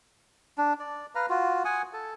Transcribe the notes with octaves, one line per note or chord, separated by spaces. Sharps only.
D4
D5
B4 F5 A#5
F4 F#4
F#5 G#5 D#6
A4